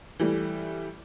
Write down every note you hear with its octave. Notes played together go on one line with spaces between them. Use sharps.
E3 G3 A3